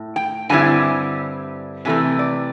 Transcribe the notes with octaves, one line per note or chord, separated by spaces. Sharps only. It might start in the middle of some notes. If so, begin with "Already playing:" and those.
Already playing: A2
G5
G2 D3 G3 C4 E4 G#5
C3 E3 A3 C4 G#5
D5